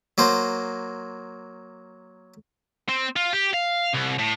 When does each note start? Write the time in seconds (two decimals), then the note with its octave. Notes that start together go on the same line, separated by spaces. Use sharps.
0.18 F#3 A#3 C5
2.89 C4
3.16 F4
3.33 G4
3.54 F5
3.94 C2
4.19 A2